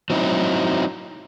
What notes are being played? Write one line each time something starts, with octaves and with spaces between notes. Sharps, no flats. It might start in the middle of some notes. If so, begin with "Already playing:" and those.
F#3 C4 D#4 E4